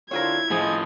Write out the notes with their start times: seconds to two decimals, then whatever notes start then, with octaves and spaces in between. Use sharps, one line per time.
0.11 D3 C4 E4 F4 A#4 B4 C#5 G#6
0.50 A2 F3 G#4 C5 D#5